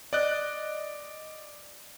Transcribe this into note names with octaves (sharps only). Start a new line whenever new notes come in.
D5 D#5 F#6